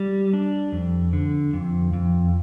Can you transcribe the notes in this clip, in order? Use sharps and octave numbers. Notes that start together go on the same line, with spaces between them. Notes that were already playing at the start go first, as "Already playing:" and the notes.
Already playing: G3
D4
F2
D3
F2
F2